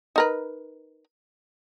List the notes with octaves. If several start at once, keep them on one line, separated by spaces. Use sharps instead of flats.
D#4 A#4 B4